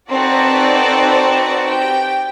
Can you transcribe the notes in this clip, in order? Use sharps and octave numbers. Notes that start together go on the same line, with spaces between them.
C4 D#4 F#4 A4 B4 D5
G4 G5